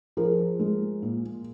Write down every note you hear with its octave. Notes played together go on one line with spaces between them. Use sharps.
F3 G#4 A#4
G#3
A#2